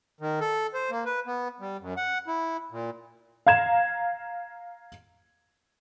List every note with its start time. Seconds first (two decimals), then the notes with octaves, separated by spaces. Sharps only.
0.20 D#3
0.41 A4
0.74 C5
0.90 A#3
1.06 B4
1.27 B3
1.60 G3
1.81 F#2
1.97 F#5
2.27 E4
2.71 A#2
3.47 F5 A#5 G#6 E7